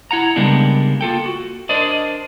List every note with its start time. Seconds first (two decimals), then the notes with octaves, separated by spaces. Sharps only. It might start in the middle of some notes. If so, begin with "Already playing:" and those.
0.11 E4 F#5 A#5
0.36 C#3 G3 G#3 A#3 B3 D4
1.01 A#3 F4 A4 G5
1.26 F#4
1.69 D4 A#4 C5 D5 D#5